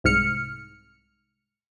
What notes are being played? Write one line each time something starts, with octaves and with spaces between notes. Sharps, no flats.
C2 G#2 F6 C#7